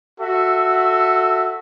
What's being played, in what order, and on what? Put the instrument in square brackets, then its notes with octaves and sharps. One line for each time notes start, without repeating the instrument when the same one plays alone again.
[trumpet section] F#4 A4 E5